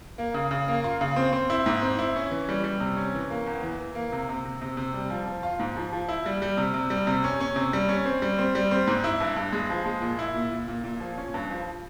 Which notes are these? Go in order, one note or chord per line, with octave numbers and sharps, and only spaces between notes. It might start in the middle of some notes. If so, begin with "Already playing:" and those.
A#3
C#3
C#3
A#3
F4
C#3
C4
C4
E4
G#2
C4
E4
C#4
E3
G3
G3
C3
C#4
E3
A#3
E2
E3
E3
A#3
C3
C3
C3
C3
C3
G3
F3
F3
F4
G#2
F3
F3
E4
G3
G3
C3
C3
G3
C3
C#4
C#4
C3
G3
C#4
C4
G3
C4
G3
C4
G#2
E4
G2
G2
G#3
F3
G#3
A#2
E4
A#2
A#2
A#2
A#2
F3
C#4
G2
F3